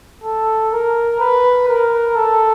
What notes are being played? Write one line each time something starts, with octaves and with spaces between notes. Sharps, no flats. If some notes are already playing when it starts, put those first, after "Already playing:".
A4
A#4
B4
A#4
A4